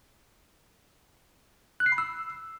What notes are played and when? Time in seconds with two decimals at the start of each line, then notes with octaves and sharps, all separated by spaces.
1.80 F#6
1.86 C7
1.92 B5
1.98 E6